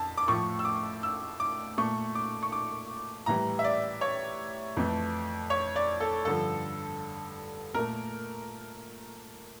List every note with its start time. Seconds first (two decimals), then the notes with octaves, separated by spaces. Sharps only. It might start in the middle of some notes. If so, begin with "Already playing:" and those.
Already playing: F2 A5
0.17 D6
0.28 A2 F3 A3 C#6
0.59 E6
0.65 D6
1.03 E6
1.40 D6
1.78 A#2 A3 C#6
2.15 D6
2.43 C#6
2.52 D6
3.26 A2 E3 G3 A#5
3.59 E5
3.64 D5
4.01 C#5
4.77 F2 E3 A3
5.50 C#5
5.76 D5
6.00 A4
6.25 G2 D3 F3 A4
7.74 A#2 A3 A#4